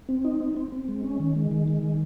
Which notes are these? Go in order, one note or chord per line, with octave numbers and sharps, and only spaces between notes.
C4
D#4
C4
C4
C4
G#3
C#4
D#3
G#3
D#3
G#3
D#3